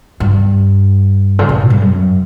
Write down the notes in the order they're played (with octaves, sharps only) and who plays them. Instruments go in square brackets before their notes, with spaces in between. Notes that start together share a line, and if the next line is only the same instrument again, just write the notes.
[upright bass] G2
C#3
B2
A2
G2
F#2